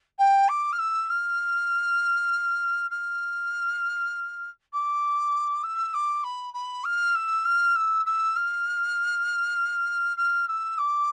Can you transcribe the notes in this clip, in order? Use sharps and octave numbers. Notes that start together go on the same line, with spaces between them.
G5
D6
F6
E6
F6
F6
D6
E6
D6
B5
B5
F6
E6
F6
E6
E6
F6
F6
E6
D6